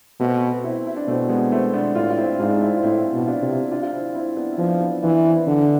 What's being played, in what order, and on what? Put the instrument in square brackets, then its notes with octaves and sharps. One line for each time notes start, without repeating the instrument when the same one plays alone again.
[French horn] B2 [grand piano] A3 C4
[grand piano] C4 E4
E4
D4
[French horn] B2 [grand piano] A3 C4
[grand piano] G#3 B3
A3 C4
B3 D4
[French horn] A2 [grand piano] D4 F4
[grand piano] F4
C4 E4
[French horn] G#2 [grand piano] D4 F4
[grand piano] C4 E4
F4
[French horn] A2 [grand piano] C4 E4
[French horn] B2
[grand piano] D4 F4
[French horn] C3
[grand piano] D4 F4
F4
C4 E4
C4 E4
B3 D4
E4
[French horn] F3 [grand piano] B3 D4
[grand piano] B3 D4
[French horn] E3 [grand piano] D4 F4
[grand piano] C4 E4
[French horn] D3 [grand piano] B3 D4